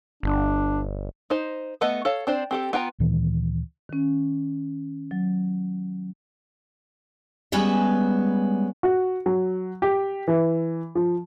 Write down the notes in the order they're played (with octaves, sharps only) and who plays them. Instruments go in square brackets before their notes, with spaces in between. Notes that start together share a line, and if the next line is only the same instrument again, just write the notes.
[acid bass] G1 [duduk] D4
[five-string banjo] D#4 C5
A3 B3 A4 D#5
A4 C#5 F5
C4 D4 C5
C4 G4 A4
B3 F4 G5 A#5
[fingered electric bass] D2 A#2 D#3 E3
[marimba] D#3 C#4
F#3
[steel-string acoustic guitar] G3 G#3 B3 C#4 B4 E5
[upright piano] F#4
F#3
G4
E3
F3